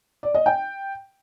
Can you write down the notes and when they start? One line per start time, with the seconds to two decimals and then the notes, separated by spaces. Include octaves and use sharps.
0.23 D5
0.34 D#5
0.46 G5